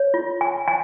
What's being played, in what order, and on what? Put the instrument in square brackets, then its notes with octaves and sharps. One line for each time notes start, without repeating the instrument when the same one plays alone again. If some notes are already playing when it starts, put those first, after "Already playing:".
Already playing: [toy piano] C#5
F4
G#5
G#5